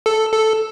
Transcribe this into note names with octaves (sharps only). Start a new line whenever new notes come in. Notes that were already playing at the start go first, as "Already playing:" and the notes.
A4
A4